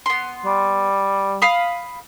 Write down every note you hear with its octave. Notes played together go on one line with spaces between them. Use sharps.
B3 C6
G3
F5 B5 D#6